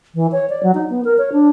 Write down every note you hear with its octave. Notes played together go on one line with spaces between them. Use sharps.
E3
C#5
D5
F#3
D#4
B3
A#4
C#5
D4